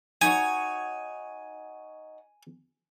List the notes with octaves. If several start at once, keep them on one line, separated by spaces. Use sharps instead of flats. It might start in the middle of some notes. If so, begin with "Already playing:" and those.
D#4 F#4 C#5 G#5